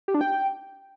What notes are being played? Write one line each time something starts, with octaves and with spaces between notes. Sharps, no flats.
G4
D4
G5